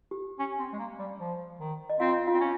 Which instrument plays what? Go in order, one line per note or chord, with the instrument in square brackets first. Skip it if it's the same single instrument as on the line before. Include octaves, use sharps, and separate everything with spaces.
[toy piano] G4
[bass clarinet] C#4
C4
G#3
A#3
G3
F3
D#3
[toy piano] D#5
[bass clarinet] C4 [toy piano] F4 F5
[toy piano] F4 F5
[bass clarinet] C4
C#4